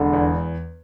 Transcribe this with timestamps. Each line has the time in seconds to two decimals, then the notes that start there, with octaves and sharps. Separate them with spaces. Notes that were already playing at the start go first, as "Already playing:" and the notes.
Already playing: E1 D3
0.13 E2